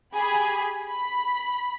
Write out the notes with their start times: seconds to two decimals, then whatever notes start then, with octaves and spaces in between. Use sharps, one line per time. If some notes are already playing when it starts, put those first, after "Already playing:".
0.14 G4 G#4 G#5 B5
0.89 B5